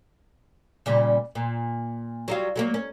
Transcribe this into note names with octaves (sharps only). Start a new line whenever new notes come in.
A#2 C#3 G3
A#2
F#3 G3 F4
F#3 G#3 A#3
C#4